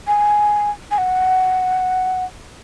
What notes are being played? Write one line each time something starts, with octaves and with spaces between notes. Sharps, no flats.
G#5
G#5
F#5